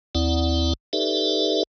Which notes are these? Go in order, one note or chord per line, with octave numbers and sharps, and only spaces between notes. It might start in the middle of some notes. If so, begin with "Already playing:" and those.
D#2 C4 E4 D5 F#5
D#4 G4 A4 B4 D5 E5